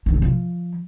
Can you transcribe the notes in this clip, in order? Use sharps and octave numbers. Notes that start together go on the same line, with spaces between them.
D#3
C3
F3